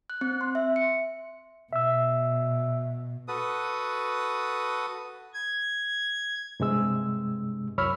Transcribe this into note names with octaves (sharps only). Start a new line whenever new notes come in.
F#6
C4
C6
E5
C#7
B2 E5 E6
F#4 A4 B4 D#6
G#6
G2 C3 G#3 E6
C2 F#2 C#5 B5 E6 F6